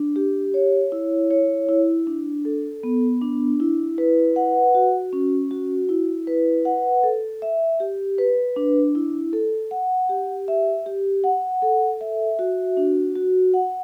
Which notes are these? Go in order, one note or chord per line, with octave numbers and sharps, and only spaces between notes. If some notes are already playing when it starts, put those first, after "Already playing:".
Already playing: D4
G4
C#5
E4
C#5
E4
D4
A4
B3
D4
E4
B4
F#5
F#4
C#4
F#4
E4
B4
F#5
A4
E5
G4
B4
D4
E4
A4
F#5
G4
E5
G4
F#5
A4
E5
F#4
D4
F#4
F#5